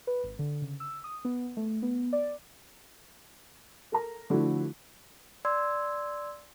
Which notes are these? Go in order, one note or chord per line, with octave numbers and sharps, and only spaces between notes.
B4
G#1
D3
C#3
E6
D#6
B3
A3
B3
D5
A4 A#4 A#5
D3 F3 A3 E4 F#4
D5 C6 E6 G#6